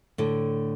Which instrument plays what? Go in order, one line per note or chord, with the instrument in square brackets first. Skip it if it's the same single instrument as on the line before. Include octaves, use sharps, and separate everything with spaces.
[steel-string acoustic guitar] A2 D3